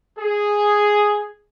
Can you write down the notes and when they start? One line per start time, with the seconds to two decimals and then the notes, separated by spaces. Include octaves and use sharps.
0.19 G#4